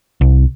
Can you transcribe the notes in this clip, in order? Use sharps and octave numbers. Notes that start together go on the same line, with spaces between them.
C2